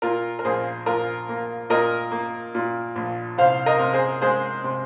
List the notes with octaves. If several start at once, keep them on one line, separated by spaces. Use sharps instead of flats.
A#2 F4 A#4
A#4
A#1 G#4 C5
A#1 F4 A#4
A#3
A#2 A#4 D#5
A#3
A#2
A#1
C2 C5 F5
A#4 D#5
C3
G#4 C5
G#3 G#4 C5
C3